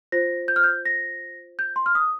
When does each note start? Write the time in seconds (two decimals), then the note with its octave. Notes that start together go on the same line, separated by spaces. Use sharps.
0.12 F4 C5 A#6
0.48 G6
0.56 F6
0.64 G6
0.85 A#6
1.59 G6
1.76 C6
1.86 F6
1.95 D#6